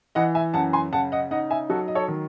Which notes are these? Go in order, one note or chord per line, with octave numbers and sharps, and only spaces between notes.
E3 D#5 F#5
E5 G#5
F#2 F#5 A5
G#5 C6
C#3 F#5 A5
D#5 F#5
D#4 D#5 F#5
E5 G#5
F#3 F#4 A4
D#5
A4 C#5
D#3